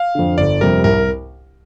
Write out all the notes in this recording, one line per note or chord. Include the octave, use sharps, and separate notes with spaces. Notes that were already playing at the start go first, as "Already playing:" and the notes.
Already playing: F5
F2 D3
G1 D5
F2 C3 G3 A#4
C2 A#4